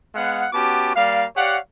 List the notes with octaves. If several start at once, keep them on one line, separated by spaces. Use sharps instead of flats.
G#3 B3 F5 F#5
B3 C#4 F#4 G4 A5 D6
G3 A#3 D5 F5
G4 C#5 D5 F5 F#5